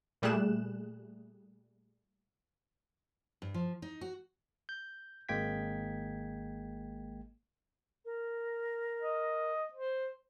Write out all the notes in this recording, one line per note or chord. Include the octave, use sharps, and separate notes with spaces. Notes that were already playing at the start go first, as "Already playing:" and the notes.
A#2 G3 A3 G#4 F#6 E7
G2
F3
D#4
F#4
G6
G#1 G#3 A#3 G5 G#6 B6
A#4
D#5
C5